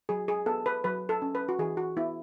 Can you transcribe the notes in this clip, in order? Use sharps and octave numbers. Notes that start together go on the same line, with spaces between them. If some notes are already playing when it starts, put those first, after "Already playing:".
F#3 G#4
G#4
B3 A4
B4
F#3 B4
A4
C#4
B4
F#4
E3 G#4
F#4
B3 E4